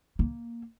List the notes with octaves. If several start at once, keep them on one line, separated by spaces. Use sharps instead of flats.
A#3